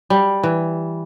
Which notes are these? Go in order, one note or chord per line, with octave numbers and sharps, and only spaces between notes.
G3
E3